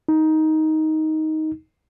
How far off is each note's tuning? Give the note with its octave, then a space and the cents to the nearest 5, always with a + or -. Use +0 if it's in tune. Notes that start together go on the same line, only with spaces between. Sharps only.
D#4 +10